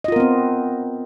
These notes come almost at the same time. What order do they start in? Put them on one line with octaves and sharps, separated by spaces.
D#5 F4 A#4 B3 C4